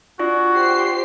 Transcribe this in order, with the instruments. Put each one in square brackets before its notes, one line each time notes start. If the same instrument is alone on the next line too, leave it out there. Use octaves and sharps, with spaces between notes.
[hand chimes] D4 F4 D5 [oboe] F#4
[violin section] G4 C5 C7